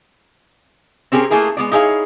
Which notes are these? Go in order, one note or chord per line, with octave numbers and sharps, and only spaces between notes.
C4 C#4 G4 G#4 A#4
A3 A#3 E4 G#4 A#4
G#3 B3 D5
D#4 E4 G#4 C#5 F5